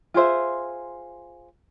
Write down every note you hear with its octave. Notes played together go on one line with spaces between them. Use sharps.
F4 G#4 C5 E5